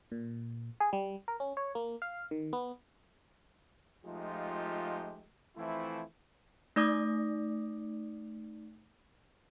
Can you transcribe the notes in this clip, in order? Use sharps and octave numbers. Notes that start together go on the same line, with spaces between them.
A#2
G#4
G3
A#4
C#4
C#5
A#3
F5
D#3
B3
F3 G#3 A3 D#4 F4 G4
E3 F3 A3 C4 E4
A3 D#4 D5 D6 D#6 A#6